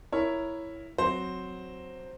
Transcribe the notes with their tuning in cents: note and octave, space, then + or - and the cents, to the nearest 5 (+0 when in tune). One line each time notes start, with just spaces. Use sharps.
E4 +0 A#4 +0 C#5 +0
F#3 +0 C4 +0 C5 +0